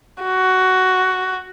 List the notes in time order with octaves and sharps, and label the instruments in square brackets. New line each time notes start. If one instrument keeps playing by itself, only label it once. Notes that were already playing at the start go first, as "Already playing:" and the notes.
[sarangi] F#4